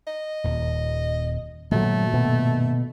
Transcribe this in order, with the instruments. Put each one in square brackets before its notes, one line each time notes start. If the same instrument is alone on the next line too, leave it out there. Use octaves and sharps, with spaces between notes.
[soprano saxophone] D#5
[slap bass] D#1 D#2
[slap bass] G2 A#2 D#3 [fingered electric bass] F#3 G3 [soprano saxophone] A3
[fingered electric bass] B2